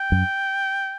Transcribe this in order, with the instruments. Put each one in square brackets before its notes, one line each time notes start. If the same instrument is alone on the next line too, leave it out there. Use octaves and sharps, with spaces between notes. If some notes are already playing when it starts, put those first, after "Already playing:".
Already playing: [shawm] G5
[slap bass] F#2